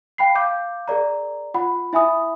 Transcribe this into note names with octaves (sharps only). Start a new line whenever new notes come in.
F5 G5 B5 C7
F5 D6 G6
G#4 A#4 D5 A#5
F4 F#5 B5
E4 E5 G#5 B5 D#6